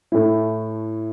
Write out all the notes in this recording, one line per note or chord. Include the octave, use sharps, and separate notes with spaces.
A2 A3 E4